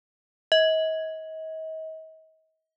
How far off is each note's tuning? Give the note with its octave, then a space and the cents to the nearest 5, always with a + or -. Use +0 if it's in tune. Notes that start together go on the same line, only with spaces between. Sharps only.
D#5 +40